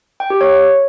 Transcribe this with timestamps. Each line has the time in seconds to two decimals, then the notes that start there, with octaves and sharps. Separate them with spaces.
0.20 G5
0.30 G4
0.41 C#5